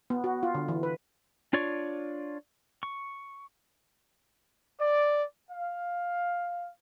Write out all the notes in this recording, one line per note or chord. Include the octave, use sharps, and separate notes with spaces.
B3
F#4
F4
D3
E3
B4
D4 F4 C#5 D5 C#6
C#6
D5
F5